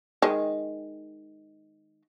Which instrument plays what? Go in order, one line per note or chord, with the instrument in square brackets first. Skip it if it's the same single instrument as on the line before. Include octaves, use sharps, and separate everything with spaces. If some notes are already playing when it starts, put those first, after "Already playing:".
[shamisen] D#3 G#3